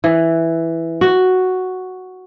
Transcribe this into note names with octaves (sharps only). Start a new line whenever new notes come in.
E3
F#4